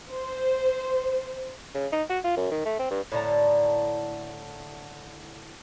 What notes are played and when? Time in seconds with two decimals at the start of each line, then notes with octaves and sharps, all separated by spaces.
0.11 C5
1.75 C#3
1.92 D#4
2.10 F#4
2.24 F4
2.37 F#2
2.51 D#3
2.65 A3
2.79 C4
2.91 G2
3.12 A2 D3 A5 A#5